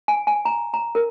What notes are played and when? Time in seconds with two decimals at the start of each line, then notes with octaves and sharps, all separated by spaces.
0.08 G#5
0.27 G#5
0.45 A#5
0.74 A#5
0.95 A#4